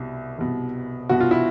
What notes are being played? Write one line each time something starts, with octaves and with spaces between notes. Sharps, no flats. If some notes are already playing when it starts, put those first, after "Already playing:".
Already playing: C2 B2
C2 B2
C2 B2 F#4
F4
E4